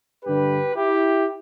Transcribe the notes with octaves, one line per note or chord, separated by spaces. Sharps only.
G2 D3 G4 B4
E4 G4